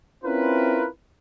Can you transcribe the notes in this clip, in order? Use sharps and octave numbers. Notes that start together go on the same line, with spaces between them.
C4 C#4 E4 F4 A#4 B4